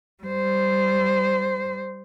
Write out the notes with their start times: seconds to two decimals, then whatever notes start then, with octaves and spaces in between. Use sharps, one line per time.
0.24 G3 C5